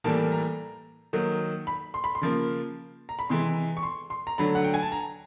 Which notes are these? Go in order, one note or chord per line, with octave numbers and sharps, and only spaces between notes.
A2 E3 G3 A#3 A5
A#5
D#3 F#3 A#3
B5
C6
B5
C6
C#3 F3 A#3
A#5
B5
C3 E3 G#3 C6
C#6
C6
C6
A#5
D3 F#3 A3 B5
F#5
G5
G#5
A5
A#5